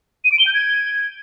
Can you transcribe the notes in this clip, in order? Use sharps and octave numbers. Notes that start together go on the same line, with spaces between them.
D#7
D7
G7
G6
G#6